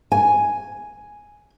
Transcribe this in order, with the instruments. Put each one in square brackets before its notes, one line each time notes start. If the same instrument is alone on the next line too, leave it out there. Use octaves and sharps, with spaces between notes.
[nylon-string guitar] G#5